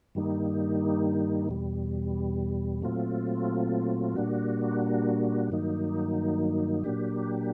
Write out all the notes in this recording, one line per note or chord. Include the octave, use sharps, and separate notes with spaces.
G2 D#3 G3 A#3 D#4
E2 B2 G3
A#2 F#3 A3 C4 F4
A#2 G3 A#3 D4 F#4
G2 D#3 F#3 A#3 D#4
A#2 F#3 A#3 D4 G4